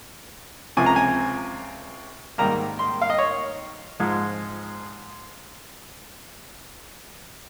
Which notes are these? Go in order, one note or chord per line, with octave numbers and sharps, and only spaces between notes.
C#2 C3 F3 G#5
A#5
G#5
G#2 D#3 G3 A#3 A#5
C6
F5
D#5
C#5
G#2 F3 G#3